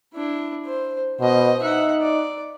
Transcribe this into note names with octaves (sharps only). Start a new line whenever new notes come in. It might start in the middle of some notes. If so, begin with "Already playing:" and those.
D4 E4
C5
B2 C5 D#5
D#4 E5 F#5
D5